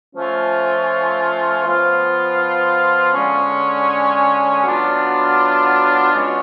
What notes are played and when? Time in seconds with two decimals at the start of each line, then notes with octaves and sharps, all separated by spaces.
0.16 F3 A3 C#4 F4
1.65 F3 B3 F4
3.14 D3 G#3 C#4
4.63 F#3 B3 D4 F4
6.13 B2 G#3 C#4 F4